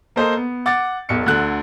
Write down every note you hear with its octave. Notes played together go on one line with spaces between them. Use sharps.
A#3 A4 C5 D#5 A#5
B3
F#5 D6 A6
E1 B1 C#7
D2 D3 F#6